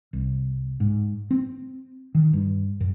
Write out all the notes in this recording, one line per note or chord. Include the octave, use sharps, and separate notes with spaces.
C2
G#2
C4
D#3
G2
F#2